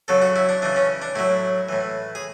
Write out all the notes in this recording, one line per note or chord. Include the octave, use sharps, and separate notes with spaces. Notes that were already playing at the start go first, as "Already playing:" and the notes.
C#3 F#3 A4
F#4
E4
D4
C#3 E3 D4
C#4
D4
A2 F#3 E4
A2 E3
G#4